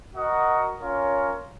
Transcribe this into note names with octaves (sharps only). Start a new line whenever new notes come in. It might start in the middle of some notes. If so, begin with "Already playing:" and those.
F#4 A#4 D#5 F#5
C#4 F4 A#4 C#5